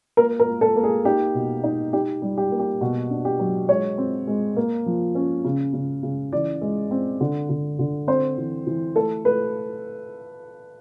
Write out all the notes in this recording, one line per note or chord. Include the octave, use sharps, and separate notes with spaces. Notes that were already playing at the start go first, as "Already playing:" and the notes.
A#3 A#4
A#4
A#3
A4
A#3
G#4
D#4 G4
B2
D#4
D#4 G4
G3
G4
A#3
G4
B2 F#4
D4
G4
F#3
G#3 C#5
C4
G#3
A#3
F3
C#4
C#3
C#3
C#3
E3 D5
G#3
C4
D3
D3
D3
C4 C5
E3
E3
A3 A4
A3 B4